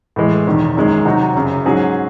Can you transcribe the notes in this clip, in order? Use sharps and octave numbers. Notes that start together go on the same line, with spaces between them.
A2 E3 G#3
E1 E2 D#3
G#1 F#2 D#3 G#3
C3 F#3 C4 D#4 F#4
F#1 F#2 C#3
G#2 F#3 C#4 G#4 C5